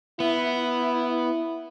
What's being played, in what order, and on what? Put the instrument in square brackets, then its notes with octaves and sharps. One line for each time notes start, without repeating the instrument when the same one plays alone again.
[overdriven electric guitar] B3 [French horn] E4